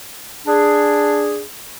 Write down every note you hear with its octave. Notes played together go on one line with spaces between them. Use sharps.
D4 G#4